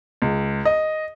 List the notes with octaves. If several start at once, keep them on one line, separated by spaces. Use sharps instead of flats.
C#2
D#5